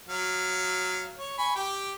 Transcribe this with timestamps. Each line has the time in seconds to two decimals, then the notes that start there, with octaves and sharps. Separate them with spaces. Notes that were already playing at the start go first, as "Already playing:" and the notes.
0.09 F#3 F5
1.18 C#5
1.38 G#5 B5 C#6
1.55 G4 G5